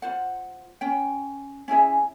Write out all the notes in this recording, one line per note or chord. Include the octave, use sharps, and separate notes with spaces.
F4 C5 F#5
C#4 G5
C#4 E4 G#4 E5